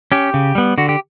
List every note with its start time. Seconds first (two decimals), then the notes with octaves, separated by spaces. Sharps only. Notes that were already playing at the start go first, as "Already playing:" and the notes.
0.12 C#4 G4
0.34 C#3
0.55 G3 B3
0.78 D3 F#4
0.89 G4